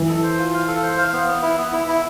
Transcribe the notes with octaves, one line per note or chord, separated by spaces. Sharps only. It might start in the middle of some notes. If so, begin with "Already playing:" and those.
Already playing: E3
A4
C5
F4
F5
A4
C5
F5
B3
B3
E4
B3
E4
E4